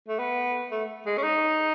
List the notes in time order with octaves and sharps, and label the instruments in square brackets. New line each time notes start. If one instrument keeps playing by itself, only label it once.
[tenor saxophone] A3
B3
A3
G#3
C#4
D#4